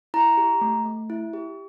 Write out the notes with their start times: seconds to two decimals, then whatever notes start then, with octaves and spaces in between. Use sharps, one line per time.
0.14 E4 A#5
0.37 G4
0.61 A3
0.86 A3
1.10 E4
1.33 G4